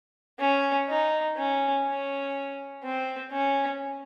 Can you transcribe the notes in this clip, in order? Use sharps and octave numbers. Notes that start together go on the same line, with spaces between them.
C#4
D#4
C#4
C#4
C4
C#4